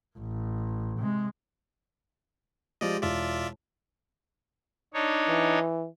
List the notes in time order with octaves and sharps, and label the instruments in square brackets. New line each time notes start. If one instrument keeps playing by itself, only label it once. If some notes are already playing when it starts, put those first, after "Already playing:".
[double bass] A1
C3 G#3
[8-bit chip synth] F3 D5 D#5 [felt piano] G#3 F4 G4
[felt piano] E1 [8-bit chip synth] F4 D5 E5
[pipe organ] D4 D#4 C#5
[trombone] E3